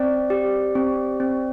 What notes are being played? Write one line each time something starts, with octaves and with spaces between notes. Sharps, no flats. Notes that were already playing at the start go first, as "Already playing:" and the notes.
Already playing: C4 D5
G4
C4
C4